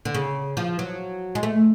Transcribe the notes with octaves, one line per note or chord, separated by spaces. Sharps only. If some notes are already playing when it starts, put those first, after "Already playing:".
D3
C#3
F3
F#3
G#3
A3